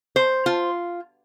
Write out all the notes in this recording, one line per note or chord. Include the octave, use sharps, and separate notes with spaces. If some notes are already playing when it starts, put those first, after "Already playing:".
C5
F4